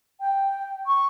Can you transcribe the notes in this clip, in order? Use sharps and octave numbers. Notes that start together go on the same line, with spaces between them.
G5
C#6